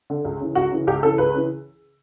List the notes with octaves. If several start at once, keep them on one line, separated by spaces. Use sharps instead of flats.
D3
C#2
C#3 E3
C#2 F#4
C#3 E3
C#2 G4
C#3 E3 A4
C#2 B4
C#3 E3